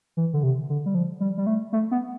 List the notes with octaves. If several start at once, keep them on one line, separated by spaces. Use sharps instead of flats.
E3
D3
C3
D3
G3
F3
G3
G3
A3
A3
B3